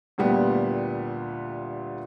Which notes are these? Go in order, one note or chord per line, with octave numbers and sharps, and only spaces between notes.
D2 A#2 G3 B3 G5